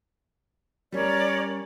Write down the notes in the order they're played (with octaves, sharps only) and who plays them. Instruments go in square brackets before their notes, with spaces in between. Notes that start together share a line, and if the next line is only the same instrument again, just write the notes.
[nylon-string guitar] G3 C#4 [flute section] A#4 C#5 D5